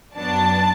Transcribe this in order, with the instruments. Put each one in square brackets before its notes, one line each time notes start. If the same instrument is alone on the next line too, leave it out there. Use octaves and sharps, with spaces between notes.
[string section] F#2 F#3 B3 D4 A5